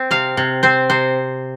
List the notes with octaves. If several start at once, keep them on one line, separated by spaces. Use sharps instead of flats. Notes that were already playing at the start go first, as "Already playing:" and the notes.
Already playing: C4
C3 F5
C3
C4 C5
C3 C5